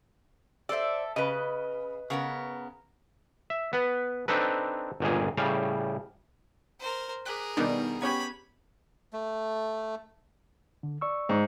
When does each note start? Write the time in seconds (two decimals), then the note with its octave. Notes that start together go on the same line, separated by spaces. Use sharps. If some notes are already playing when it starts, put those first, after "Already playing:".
0.69 A4 C5 D5 E5
1.16 C#3 B4 D#5
2.10 C#3 B3 A#4
3.50 E5
3.73 B3 B4
4.28 C4 D4 D#4 A4 B4
5.00 G1 C#2 A#2 G#4
5.37 A2 C#3 G3 F5
6.80 A#4 C5
7.26 G#4 A#4 D6 F#6 B6
7.57 B2 D#3 G3 B3 D4 D#4
8.02 B3 C#4 G4 B5 G#6
9.13 A3
10.83 D3
11.01 D5 C#6 E6
11.29 G#2